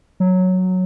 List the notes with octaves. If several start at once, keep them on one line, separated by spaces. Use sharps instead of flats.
F#3